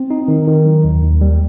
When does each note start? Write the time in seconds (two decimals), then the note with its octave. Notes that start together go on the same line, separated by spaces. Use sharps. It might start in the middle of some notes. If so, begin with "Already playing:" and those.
Already playing: C4
0.10 D#4
0.28 D#3
0.47 D#3
0.65 F#3
0.84 D#2
1.02 D#2
1.21 G3